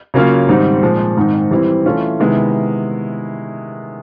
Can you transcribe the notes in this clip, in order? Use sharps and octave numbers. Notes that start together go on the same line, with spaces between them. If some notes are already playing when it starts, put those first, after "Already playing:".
C#3 F#3 A#3 C#4 F4
G#2 D#3 G3 C4 D#4
A#2 F3 G#3 C4
G#2 D#3 G#3 C4 D#4
E3 G3 C4 E4
E3 A3 C#4 F4
C3 D#3 G#3 B3 E4